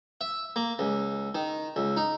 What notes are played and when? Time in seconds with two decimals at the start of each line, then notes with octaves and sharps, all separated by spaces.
0.21 E5
0.56 A#3
0.79 C#2
1.35 D#3
1.76 C#2
1.97 D#4